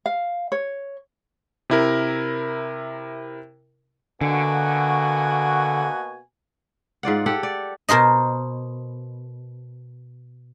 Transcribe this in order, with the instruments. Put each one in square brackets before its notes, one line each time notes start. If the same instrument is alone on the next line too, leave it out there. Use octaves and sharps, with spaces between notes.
[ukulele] F5
C#5
[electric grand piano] C3 E4 A#4
[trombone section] B2 A#3 F#4 [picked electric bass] D3 [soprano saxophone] G#5
[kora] G#2 F4 D5 F#5
G4 A4 F#5
D5
[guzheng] B2 A#4 C5 D#5